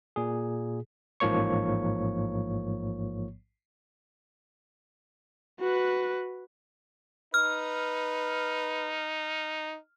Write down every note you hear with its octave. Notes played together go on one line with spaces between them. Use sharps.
A#2 G#4
A1 G#2 F3 A#3 C#5 C#6
F#4 B4
D#4 B4 F6